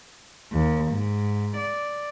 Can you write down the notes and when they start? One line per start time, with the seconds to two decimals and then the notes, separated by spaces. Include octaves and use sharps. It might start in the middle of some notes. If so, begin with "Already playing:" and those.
0.53 D#2
0.91 G#2
1.57 D5